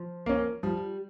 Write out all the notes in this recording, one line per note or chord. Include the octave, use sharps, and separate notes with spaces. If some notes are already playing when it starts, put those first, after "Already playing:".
Already playing: F3
A#3 C#4
F3 G3